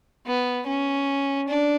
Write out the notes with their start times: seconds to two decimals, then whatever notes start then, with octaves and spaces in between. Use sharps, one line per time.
0.26 B3
0.67 C#4
1.47 D4